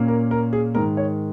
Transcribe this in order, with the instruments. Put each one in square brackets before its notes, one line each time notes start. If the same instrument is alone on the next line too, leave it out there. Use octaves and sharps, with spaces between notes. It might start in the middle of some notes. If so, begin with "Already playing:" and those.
Already playing: [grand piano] A#2 A#3 C#4
A#4
A#4
G#4
G#2 D#3 G#3 A#4
C#5